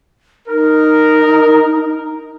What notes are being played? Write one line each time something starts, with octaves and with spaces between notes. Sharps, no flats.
D#4 A#4